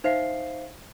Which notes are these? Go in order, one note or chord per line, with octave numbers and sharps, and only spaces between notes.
D#4 C5 E5 F5 C7